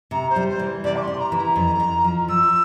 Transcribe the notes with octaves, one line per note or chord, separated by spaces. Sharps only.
C3 A#5
C5
G3
C5
E3
C3 D5
D6
C6
C3
A#5
E3
A#5
F2
F2
F3
F3 E6